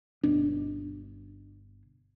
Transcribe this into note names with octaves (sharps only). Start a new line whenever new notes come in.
G1 B2 D4